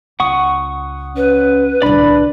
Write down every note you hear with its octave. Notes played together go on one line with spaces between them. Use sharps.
C#2 F#5 C#6 D#6
C#4 B4
D1 C2 D4 D5 B5